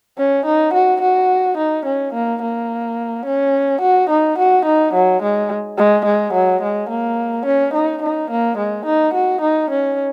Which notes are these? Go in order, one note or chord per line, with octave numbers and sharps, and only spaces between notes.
C#4
D#4
F#4
F#4
D#4
C#4
A#3
A#3
C#4
F#4
D#4
F#4
D#4
F#3
G#3
G#3
G#3
F#3
G#3
A#3
C#4
D#4
D#4
A#3
G#3
D#4
F#4
D#4
C#4